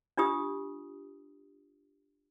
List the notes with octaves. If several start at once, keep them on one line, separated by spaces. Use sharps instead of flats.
D4 F4 G4 D#6